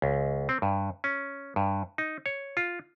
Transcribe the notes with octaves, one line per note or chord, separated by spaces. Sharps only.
C#2
C4
G2
C#4
G2
D#4
C#5
F4